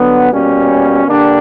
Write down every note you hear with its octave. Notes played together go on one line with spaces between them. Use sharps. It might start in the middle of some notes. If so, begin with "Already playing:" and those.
Already playing: D3 F#3 B3
B2 G3 A#3 C#4
D3 A#3 D4 G4